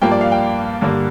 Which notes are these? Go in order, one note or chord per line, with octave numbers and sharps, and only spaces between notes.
G2 F3 A#3 G5
D5
F5
G5
G2 D3 A#3